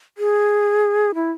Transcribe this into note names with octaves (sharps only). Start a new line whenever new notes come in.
G#4
E4